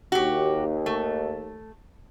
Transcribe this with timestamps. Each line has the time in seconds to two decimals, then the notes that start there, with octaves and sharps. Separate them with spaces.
0.12 D#2 F#4 G4
0.86 A3